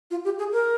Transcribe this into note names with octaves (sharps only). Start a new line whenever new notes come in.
F4
G4
G#4
A#4